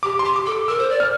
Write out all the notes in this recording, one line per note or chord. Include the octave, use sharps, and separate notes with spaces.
G4 D6
C6
G4
D6
A4
D6
A#4 E6
C5
D5
F6